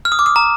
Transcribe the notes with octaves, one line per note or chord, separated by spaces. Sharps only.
F6
D#6
D6
D#6
A#5